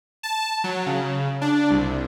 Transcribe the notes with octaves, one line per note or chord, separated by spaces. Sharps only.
A5
F#3
C#3
D4
C2